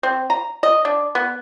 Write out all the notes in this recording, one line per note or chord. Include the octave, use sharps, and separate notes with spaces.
C4
A#5
D#5
D4
B3